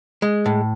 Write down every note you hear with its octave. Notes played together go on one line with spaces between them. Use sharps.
G#3
A2